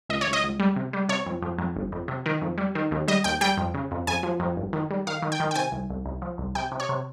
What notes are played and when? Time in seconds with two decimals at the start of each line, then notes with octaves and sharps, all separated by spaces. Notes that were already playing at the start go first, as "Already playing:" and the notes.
0.09 C#2 D#5
0.21 C#5
0.27 C#2
0.33 D#5
0.44 C#2
0.59 G3
0.76 C3
0.93 G3
1.09 C3 C#5
1.26 F2
1.42 F2
1.58 F2
1.76 G1
1.92 F2
2.08 C3
2.26 D#3
2.41 F2
2.58 G3
2.75 D#3
2.91 D#2
3.08 G3 D#5
3.24 D#2 G5
3.41 G3 G5
3.57 F2
3.74 C#3
3.91 F2
4.07 F2 G#5
4.23 F3
4.40 F2
4.57 G1
4.73 D#3
4.90 G3
5.07 D#3 F5
5.22 D#3
5.32 G5
5.40 D#3
5.51 G5
5.55 C3 G#5
5.72 C2
5.90 C2
6.05 C2
6.22 F3
6.38 C2
6.55 C3 G5
6.72 C3
6.80 C#5
6.89 C3